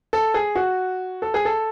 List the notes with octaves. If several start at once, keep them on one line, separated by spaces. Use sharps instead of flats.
A4
G#4
F#4
A4
G#4
A4